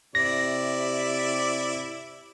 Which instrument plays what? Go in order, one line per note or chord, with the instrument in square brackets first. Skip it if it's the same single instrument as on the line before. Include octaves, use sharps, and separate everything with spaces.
[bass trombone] C3 [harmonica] E4 D5 [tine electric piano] A#6